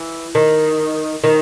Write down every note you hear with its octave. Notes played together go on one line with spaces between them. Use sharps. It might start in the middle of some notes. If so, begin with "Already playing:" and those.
Already playing: E3
D#3
D#3